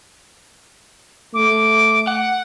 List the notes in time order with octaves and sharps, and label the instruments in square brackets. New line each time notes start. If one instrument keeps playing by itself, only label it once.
[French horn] A3 [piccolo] D6
[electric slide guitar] F#5